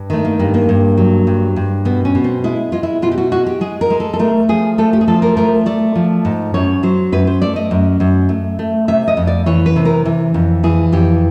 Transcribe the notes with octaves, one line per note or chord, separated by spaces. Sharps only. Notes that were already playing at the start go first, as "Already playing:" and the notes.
Already playing: G2
D#3 A3
A#3
G2 A#3
A#3
G2
F#3
G2
G2
B2 B3
C#4
B2
C4
G#3 E4
G#3 F4
E4
B2 F4
G4
F#4
G#3 F#4
G4
G#3 G#4
A#4
G#3
A4
A4
A3 A#4
F3 G#4
A3 A4
G4
G#4
F3 A4
A#4
A3 A#4
A3 D5
F3
G#2
F#2 C#5
F#3 C5
F#2 B4
C5
A3 D5
D#5
F#2
F#2
A3
A3
C3 E5
D#5
F2
D5
E3 C#5
B4
C3
A#4
E3
F2
E3 G#4
F2 G4